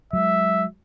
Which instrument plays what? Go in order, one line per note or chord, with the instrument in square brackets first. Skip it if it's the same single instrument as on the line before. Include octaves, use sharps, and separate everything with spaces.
[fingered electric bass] F#3 G#3 [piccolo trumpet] E5